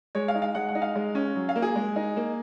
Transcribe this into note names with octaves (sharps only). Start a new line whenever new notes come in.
G#3 C#5
F5
D#4
F5
G#3 F#5
F#5
D#4
F5
G#3
C#4
F#3
F5
A#3
G#4
G#3
D#4
A#3